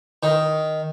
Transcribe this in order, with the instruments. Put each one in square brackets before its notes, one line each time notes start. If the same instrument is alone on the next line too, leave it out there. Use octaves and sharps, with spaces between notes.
[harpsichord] D#3